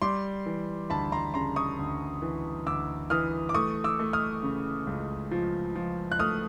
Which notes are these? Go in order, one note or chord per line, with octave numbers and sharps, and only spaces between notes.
G3 C6 D6
E3
D2 A5 B5
A#5 C6
C#3 A#5 C6
C#6 D#6
D2
E3
D2 D6 E6
E3 D#6 F6
D6
A3 C#6 D#6
D6 E6
A3
D#6 F6
C#3
C#2
F3
F3
F#6
A3 D#6 F6